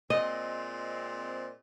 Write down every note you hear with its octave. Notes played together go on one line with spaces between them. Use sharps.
A#2 G#3 C4 D#5